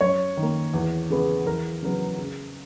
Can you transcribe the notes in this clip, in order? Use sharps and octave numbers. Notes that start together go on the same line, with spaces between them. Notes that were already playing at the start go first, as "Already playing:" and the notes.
F#2 C#5
D#3
A#3
E2
C#3 G#3 B3
E2 A#4
C#3 F#3 B3
C#3